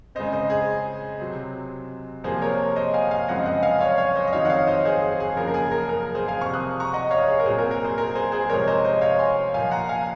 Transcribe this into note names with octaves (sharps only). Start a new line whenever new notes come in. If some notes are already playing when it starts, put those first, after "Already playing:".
C#3 G#3 C4 C5 D#5
C5 D#5
G#4
C3 F#3 C4
C3 F3 A#3 G#4 C5
A#4 C#5
C5 D#5
F5 G#5
F5 G#5
F#2 C#3 F3 G#3 C4 D#5 F#5
D#5 F#5
F5 G#5
C#5 F5
C#5 F5
C5 D#5
D#5
F2 D#3 F#3 C4 C#5 F5
F#5
C#5 F5
C5 D#5
G#4 C5
G#4
G#4
F#2 C#3 F3 A#3 A#4
A#4
G#4
A#4
A#4
G#4 C5
F5 G#5
C3 F3 C4 C#6 F6
D#6 F#6
A#5 C#6
D#5 F#5
C#5 F5
G#4
A#4
A#2 F#3 C4 G#4 C5
A#4
A#4
G#4 C5
A#4
G#4 C5
G#4 C5
C3 F3 G#3 A#4 C#5
C5 D#5
C5 D#5
C#5 F5
G#5 C6
A#2 F3 A#3 F5 G#5
F#5 A#5
F5 G#5